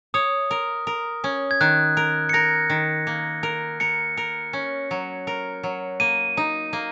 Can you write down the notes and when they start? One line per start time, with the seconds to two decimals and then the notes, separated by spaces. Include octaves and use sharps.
0.14 C#5 D#6
0.51 A#4
0.87 A#4
1.24 C#4
1.51 G#6
1.61 D#3 F#6
1.97 A#4
2.29 C#7
2.33 A#4 A#6
2.70 D#3
3.07 A#3
3.43 A#4
3.80 A#4 C#7
4.17 A#4
4.53 C#4
4.91 F#3
5.27 A#4
5.63 F#3
6.00 A#3 D#7
6.37 D#4
6.73 A#3